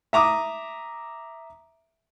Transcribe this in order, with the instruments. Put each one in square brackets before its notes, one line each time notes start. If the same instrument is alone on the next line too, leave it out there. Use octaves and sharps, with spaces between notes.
[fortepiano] E5 A#5 D6 D#6